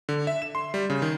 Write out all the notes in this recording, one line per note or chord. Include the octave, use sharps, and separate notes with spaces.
D3
E5
E7
C6
G3
C#3
D#3